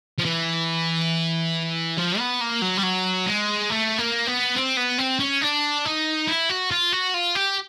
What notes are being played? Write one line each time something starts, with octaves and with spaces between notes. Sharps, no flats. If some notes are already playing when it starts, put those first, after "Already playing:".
F3
E3
F3
B3
A#3
F#3
G3
F#3
G#3
A3
A#3
B3
C4
B3
C4
C#4
D4
D#4
E4
F#4
F4
F#4
F4
G4